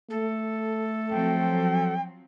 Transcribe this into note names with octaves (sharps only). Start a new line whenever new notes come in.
A3 A4
F3 F#3 C4 G5